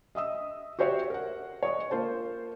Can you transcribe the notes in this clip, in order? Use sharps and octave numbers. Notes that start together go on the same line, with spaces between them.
D#5 E5 D#6 E6
F#4 G4 C5 C#5 E5 F#5
A#4 F#5
C#5 D#5 C#6
A#3 F4 C5 A5